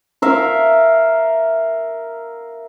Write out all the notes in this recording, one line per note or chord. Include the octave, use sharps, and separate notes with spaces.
A#4 E5 F5